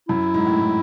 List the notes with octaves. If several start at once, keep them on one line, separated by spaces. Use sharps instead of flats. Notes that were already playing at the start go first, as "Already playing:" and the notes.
F#2 E4
G#2
A2
A2